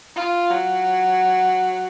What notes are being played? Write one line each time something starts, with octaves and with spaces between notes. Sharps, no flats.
F4
F#3